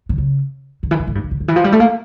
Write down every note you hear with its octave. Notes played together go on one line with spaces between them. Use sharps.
D3
C#3
D3
E3
D3
A2
G2
A#2
C#3
D3
E3
F3
G3
A3
A#3